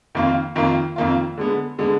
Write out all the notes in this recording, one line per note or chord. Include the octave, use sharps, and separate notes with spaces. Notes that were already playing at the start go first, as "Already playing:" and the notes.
F2 D#3 A#3 F4
F2 D#3 A#3 F4
F2 D#3 A#3 F4
D3 G#3 B3
D3 G#3 B3